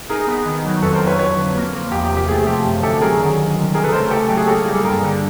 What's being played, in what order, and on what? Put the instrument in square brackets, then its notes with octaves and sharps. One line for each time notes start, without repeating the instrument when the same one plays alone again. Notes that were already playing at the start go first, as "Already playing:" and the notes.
[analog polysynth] D#4 [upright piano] G#4 A#4
[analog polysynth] B3
D#3
F#3
[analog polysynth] F2 [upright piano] A4 B4
[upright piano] A#4 C5
[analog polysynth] F#3
[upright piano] B4 C#5
[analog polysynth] F2 [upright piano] B4 C#5
[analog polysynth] D3
A#3
F3
[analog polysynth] E2 [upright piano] G4
[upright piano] G4
[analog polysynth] C3
[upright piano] G4
[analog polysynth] A3 [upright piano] G#4
[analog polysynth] F3 [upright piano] G4
[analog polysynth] F#2
[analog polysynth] D3 [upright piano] G4 A4
[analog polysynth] F#3 [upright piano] G#4 A#4
[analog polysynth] D#3
C2
C3
[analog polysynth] C#3 [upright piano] G#4 A#4
[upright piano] A4 B4
[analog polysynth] A3 [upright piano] A#4 C5
[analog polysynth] C#3 [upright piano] G4 A4
[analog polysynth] F#3 [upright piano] G4
[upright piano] G#4
[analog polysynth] A#3 [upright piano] G4 A4
[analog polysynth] G3 [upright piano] G#4
[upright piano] A4
[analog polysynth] G2 [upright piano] G#4 A#4
[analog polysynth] D3